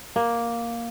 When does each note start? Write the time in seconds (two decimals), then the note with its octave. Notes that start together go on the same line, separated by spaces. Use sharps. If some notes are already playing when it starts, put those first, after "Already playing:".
0.16 A#3